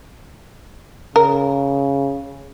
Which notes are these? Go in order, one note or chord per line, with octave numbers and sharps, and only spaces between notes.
C#3 A#4